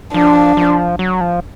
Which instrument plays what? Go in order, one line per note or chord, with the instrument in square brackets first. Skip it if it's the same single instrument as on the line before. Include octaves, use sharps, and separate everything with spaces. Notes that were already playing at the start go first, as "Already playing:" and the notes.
[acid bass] F3 [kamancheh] D4
[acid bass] F3
F#3
F3